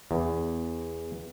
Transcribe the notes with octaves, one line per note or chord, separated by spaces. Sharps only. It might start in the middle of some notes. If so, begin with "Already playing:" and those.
E2